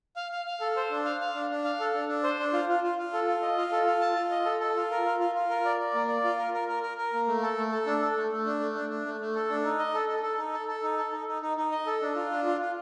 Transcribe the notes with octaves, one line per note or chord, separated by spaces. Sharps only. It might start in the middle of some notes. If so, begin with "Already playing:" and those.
F5
F5
F5
A4
C5
D4
F5
F5
D4
D4
F5
A4
D4
D4
C5
D4
F4
F4
F4
F4
A4
F4
D#5
F4
A4
F4
A5
F4
D#5
A4
A4
F4
A#4
F4
F4
F4
A#4
D5
D5
A#3
D5
F4
A#4
A#4
A#4
A#4
A#4
A#3
A3
A4
A3
A4
D4
A4
A3
A3
D4
A3
D4
D4
A3
A3
A4
D4
D#4
D#5
A4
A4
A4
D#4
A4
A4
D#4
A4
D#4
D#4
D#4
D#4
D#5
A4
D4
F4
D4
F4
F4